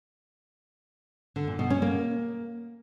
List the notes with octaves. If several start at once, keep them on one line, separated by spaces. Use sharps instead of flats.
D3
A#2
B2
C#4
A#3